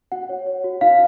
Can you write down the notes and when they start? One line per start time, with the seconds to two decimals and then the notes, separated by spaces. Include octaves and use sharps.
0.12 F#4 F#5
0.29 C#5
0.47 C#5
0.64 F#4
0.81 D#4 F5